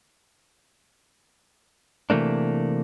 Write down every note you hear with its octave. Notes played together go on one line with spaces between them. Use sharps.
C3 E3 A3 A#3 D4